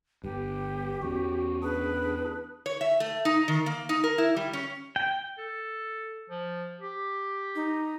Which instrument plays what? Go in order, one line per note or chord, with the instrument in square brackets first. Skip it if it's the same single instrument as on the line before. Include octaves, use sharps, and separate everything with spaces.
[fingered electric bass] G1 G2 [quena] G4
[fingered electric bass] E2 B3 C#4 [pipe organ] F#4
[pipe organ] D4 G#4 [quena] B4
[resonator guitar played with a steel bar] C#5
E5
A3
D#4
D#3
A#3
D#4
A#4
E4
G3
C#4
[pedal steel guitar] G5
[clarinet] A4
F3
G4
[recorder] D#4